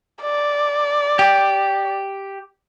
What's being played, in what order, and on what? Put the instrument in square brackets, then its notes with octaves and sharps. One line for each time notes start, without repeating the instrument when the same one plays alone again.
[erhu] D5
[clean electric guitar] G4